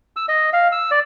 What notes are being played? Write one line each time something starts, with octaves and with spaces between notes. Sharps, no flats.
E6
D#5
F5
E6
D5